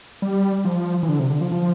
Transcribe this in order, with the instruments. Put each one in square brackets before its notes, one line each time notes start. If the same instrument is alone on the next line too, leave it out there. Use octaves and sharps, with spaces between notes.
[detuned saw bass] G3
F3
E3
D3
C3
D3
F3
F3